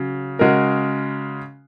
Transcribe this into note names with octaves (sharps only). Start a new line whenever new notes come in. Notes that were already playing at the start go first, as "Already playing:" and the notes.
Already playing: C#3 F#3
C#3 G#3 F#4 A#4